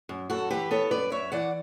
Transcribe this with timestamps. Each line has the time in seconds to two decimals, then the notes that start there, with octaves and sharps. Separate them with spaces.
0.09 F#2
0.30 F#2 F#4 A4
0.50 E3 G4 B4
0.71 B3 A4 C#5
0.91 F#2 B4 D5
1.12 F#2 C#5 E5
1.32 E3 D5 F#5